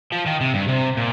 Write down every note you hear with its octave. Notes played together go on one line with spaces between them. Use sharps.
F3
D#3
C3
G2
C3
A#2